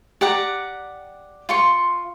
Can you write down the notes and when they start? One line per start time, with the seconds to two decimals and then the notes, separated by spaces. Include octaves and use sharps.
0.21 G4 D5 F#5 A#5
1.49 F4 C6 C#6